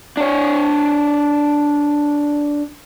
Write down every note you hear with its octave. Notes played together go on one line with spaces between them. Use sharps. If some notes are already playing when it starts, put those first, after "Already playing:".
D4 C#5